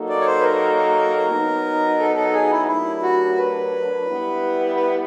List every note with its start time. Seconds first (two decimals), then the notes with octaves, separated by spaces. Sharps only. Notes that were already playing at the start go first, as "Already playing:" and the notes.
Already playing: F#3 A#3 D#4 F#4 A4
0.09 D5
0.21 C#5
0.26 C5
0.40 B4
0.43 A#4
1.30 F#3 B3 D#4
1.99 A4
2.16 A4
2.33 G#4
2.51 E4
2.68 F#3 A3 D4 E4 G4 A#4
3.02 F#4
3.37 B4
4.06 G3 B3 E4
4.75 B4